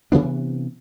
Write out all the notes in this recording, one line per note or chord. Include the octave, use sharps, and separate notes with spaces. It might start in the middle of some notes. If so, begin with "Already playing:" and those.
C3 E3 B3 D4